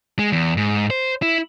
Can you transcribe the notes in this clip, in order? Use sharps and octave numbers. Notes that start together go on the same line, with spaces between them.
G#3
E2
G#2
C5
E4